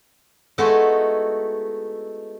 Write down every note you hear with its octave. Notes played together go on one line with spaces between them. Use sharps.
G#3 A3 B3 D#4 E4 F#4